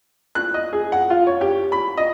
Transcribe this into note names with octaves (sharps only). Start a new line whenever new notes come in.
F#6
D#5
G#4
F#5
F4
C#5
G4
B5
D#5